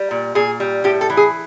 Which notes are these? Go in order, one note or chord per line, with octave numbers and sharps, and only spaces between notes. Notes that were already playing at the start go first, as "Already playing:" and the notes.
Already playing: G3
A#2
A#2 G#4
G3
A2 G4
A4
E3
G#4